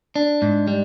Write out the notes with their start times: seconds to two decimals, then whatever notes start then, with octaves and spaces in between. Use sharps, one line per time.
0.16 D4
0.42 G#2
0.68 G3